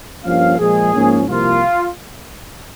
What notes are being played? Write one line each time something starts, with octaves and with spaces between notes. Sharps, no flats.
G2 F3 A#3 C#4 F5
A#2 F3 G#3 G#4
G#2 F3 A#3 C#4
C2 C3 F3 A#3 F4